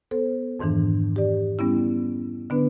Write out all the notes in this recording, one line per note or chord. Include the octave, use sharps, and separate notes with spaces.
B3 A4 C5
F2 G#2 D#3 E3 D4
G4 D5
G3 B3 C#4 E4
D3 B3 D4 B4